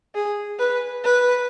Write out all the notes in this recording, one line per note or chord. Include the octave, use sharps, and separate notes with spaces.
G#4
B4
B4